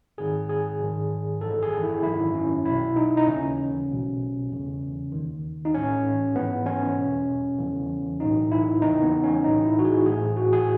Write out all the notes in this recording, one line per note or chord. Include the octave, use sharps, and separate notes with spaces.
G#1 G#2 D#3 G#4
G#4
G#1 G#2 D#3
G#1 F#2 E3 A4
G#4
E4
G#1 F#2 D#3 E4
C#4
B1 B2 E4
D#4
D#4
D#2 C#3 E3 C#4
B1 B2
E2 C#3 E3
D#2 D#3
D#4
B1 A2 E3 C#4
G#1 G#2 E3 B3
C#4
E2 B2
E2 C#3 E3
B1 A2 E3 D#4
E4
E2 C#3 E3 D#4
B3
C#4
B1 A2 E3 D#4
E4
F#4
G#4
A1 A2 E3 G#4
F#4
G#4